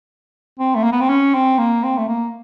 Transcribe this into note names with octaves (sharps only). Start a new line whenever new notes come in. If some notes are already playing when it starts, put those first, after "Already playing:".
C4
A3
A#3
B3
C4
C#4
C4
A#3
C4
A3
A#3